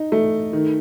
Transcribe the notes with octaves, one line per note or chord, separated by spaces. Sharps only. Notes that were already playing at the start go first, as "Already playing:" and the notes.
Already playing: D#4
A3
D#3